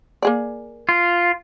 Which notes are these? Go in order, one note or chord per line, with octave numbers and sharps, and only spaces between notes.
A#3 G#4 D5
F4